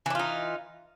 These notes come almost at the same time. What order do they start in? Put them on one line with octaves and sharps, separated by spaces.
E3 D4 F4 D#4